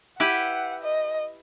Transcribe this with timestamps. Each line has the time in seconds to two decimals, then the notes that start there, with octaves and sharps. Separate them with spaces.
0.20 E4 G4 B4 F#5
0.83 D#5